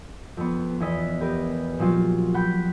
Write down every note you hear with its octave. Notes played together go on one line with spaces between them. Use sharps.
F2 B3
E2 B3 E4 D#5 B6
G4 A#4 B4
A#2 F3 F#3 F4
F#5 G5 B5 G6 B6